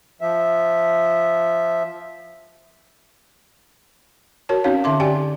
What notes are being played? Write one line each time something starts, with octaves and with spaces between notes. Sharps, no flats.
F3 E5
F#4 A#4 C#5 A5
C4 C#4 D#4 F#4 C#5 F5
D3 D#4 E5 C6 D6
G4 D5 G5 G#5